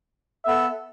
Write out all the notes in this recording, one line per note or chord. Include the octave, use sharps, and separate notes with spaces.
B3 A4 E5